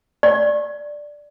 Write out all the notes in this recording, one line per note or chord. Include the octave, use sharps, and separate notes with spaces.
D5